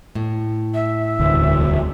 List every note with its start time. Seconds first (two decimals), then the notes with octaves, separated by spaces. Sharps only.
0.15 A2
0.74 E5
1.19 E1 D2